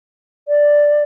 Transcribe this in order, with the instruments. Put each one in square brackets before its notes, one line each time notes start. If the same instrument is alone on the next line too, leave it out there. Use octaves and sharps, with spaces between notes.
[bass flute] D5